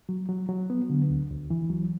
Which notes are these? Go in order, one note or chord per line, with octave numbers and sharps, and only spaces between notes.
F#3
F#3
F#3
B3
D3
D2
D2
E3
F#3